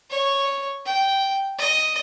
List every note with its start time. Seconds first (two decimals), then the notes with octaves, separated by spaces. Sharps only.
0.10 C#5
0.86 G5
1.58 D#5